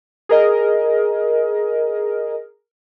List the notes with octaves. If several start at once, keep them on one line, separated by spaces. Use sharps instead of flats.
G#4 A#4 D#5